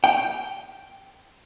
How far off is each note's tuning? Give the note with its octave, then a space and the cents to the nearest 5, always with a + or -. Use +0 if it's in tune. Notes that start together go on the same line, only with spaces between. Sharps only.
G5 -5